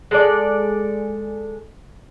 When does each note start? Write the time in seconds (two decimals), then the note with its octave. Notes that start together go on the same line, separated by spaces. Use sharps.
0.11 G#3 A4 D5